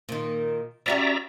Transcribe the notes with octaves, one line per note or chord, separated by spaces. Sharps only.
A#2 D#3
C#4 F#4 G4 D5 E5 A#5